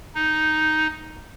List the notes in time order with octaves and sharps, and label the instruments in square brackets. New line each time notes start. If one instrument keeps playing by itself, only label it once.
[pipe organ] D#4